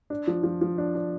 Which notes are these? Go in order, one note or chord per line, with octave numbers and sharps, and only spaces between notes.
D4
F3
F3
F3
D4
D4